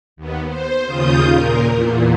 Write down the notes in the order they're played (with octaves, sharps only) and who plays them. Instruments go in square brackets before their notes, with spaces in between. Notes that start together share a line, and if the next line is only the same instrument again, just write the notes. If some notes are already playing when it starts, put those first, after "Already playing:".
[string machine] D#2 B3
C5
D#2 C#3 F4 D#6 G6
A#2 A#4
E2 A#2